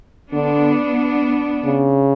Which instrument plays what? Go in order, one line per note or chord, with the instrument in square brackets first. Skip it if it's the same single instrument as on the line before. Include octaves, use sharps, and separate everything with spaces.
[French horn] D3 [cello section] B3 D4
[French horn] C#3